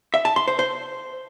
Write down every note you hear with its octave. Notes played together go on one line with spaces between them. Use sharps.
E5
A5
C6
C5
C5